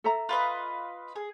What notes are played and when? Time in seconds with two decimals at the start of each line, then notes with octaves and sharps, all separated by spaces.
0.04 A4 E5 A#5
0.29 F4 B4 D#5
1.16 G#4